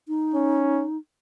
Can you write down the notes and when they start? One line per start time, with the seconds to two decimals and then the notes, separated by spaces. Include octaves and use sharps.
0.08 D#4
0.34 C#4